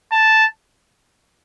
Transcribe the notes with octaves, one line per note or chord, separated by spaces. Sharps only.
A5